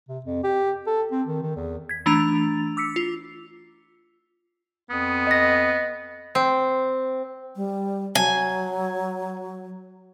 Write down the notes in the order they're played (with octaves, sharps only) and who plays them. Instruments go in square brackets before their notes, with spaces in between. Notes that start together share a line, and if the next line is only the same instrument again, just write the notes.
[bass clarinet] C3
F2
G4
A4
C4
D#3
D#3
E2
[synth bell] G#6 B6
E3 A3 D4 A#5 A6 F7
D6 E6 B6 C#7
F4
[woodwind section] F2 D#6 [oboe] B3
[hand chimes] D#5 A#6
[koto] C4
[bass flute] G3
[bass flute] F#3 [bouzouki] G#5